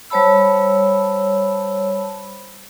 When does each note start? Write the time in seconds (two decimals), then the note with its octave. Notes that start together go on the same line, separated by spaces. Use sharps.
0.10 G3 C5 C#5 A5 B5 E6